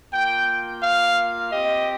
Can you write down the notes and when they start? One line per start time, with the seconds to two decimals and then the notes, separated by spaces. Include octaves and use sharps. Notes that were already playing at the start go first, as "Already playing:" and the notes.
0.13 A#3 F4 G5
0.81 F5
1.51 C4 G4 D#5